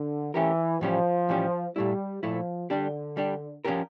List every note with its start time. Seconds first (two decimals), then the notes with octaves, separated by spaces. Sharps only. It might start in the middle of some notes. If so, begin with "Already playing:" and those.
Already playing: D3
0.34 E3 A3 C#4 G4 A#4
0.81 A2 E3 F3 G3 C#4 G4
1.29 A2 E3 G3 C#4 G4
1.76 A#2 G3 A3 E4
2.22 A#2 F3 A3 E4
2.70 D3 G3 D4 G4
3.17 G3 D4 G4
3.65 F3 C#4 G4 A#4